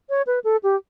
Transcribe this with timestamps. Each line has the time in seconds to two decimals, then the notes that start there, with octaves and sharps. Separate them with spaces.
0.09 C#5
0.27 B4
0.44 A4
0.63 G4